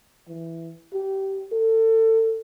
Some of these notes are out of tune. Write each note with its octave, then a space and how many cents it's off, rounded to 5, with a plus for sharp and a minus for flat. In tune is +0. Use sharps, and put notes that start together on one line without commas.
E3 +5
G4 -20
A4 +30